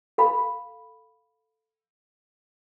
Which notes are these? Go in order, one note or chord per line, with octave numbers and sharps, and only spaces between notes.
A4 F5 B5